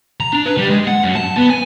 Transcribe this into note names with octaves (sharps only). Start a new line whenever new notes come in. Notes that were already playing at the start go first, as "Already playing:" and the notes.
A#5
D4
B4
G3
G#3
F#5
F#2
A5
B3
G#5